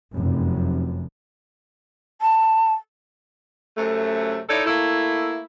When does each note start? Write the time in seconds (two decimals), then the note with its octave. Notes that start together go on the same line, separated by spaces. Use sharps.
0.12 F1 F#2
2.22 A5
3.77 F#2 C3 A3
4.49 D#4 E4 A4 C#5 D5
4.66 A3 A#3 E4